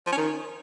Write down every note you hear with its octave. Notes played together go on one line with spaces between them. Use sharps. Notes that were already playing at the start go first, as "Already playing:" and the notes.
F3
C#4
D#3